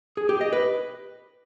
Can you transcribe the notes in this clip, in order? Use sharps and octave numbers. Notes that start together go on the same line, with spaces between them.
G#4
G4
D#5
B4